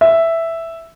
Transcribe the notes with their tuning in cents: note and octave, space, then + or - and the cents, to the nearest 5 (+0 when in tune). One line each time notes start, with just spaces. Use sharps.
E5 +0